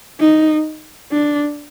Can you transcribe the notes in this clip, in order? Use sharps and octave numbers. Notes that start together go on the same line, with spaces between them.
D#4
D4